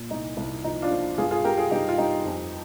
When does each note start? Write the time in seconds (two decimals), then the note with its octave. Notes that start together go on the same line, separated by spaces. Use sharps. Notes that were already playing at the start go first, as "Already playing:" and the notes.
Already playing: A#2
0.10 C2 D#4
0.37 C2
0.64 F3 D#4
0.82 D4 F4
0.91 F3
1.18 G2 F4 G#4
1.31 F4 G#4
1.44 G2 G4 A#4
1.57 F4 G#4
1.71 G2 D#4 G4
1.88 F4
1.98 G2 D#4 G4
2.25 F2